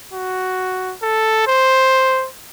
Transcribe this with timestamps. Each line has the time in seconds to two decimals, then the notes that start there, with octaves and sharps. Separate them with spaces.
0.14 F#4
1.02 A4
1.47 C5